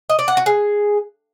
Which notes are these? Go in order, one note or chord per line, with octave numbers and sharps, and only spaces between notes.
D#5
D5
F#5
F#4
G#4